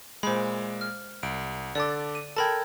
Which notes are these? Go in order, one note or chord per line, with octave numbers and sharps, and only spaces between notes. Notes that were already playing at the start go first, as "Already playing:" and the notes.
A#2 G#3 C5 B5
F6
C2 D7
D3 A4 D5 D6 A6
D#7
A4 A#4 G5 A5 B5 G#6